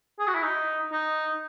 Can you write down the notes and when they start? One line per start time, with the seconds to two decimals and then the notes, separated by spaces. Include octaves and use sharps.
0.19 G#4
0.28 F#4
0.35 E4
0.42 D#4
0.92 D#4